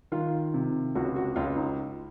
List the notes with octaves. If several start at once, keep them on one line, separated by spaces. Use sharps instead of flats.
D#3 F4
C3
C#2 F#4
F#4
C#2 F4
D#4